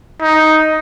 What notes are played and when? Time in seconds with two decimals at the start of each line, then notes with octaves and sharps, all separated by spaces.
0.21 D#4